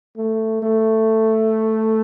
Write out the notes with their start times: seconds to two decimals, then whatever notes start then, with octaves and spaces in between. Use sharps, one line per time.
0.17 A3
0.62 A3